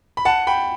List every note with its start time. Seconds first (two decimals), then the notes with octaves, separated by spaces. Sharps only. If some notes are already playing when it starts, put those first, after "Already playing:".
0.17 B5
0.25 F#5 A5
0.47 G5 B5